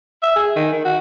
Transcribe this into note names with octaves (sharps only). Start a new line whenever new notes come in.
E5
G#4
D#3
D#3
F#4